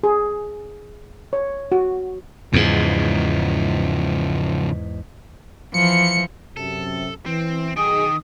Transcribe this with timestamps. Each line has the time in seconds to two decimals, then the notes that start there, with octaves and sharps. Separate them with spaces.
0.03 G#4
1.33 C#5
1.72 F#4
2.53 E2 G#2 C#3 F3
5.74 E3 F3 C#7
6.57 F#2 C3 A4
7.26 E3 C4
7.77 B1 D#3 D#4 G#4 G5 D#6